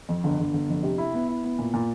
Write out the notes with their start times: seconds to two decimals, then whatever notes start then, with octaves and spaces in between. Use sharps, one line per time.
0.09 F2
0.24 G1
0.39 G1
0.53 G1
0.69 F2
0.83 C3
0.98 E4
1.14 B3
1.28 E4
1.44 B3
1.59 A#2
1.74 A#2